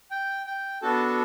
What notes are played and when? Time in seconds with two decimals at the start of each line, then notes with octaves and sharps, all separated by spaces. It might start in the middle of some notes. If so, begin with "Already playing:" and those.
0.11 G5
0.46 G5
0.82 B3 D4 F#4 A4 A5